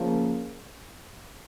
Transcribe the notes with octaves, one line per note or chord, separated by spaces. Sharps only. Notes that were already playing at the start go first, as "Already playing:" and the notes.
Already playing: C#3 F3 A#3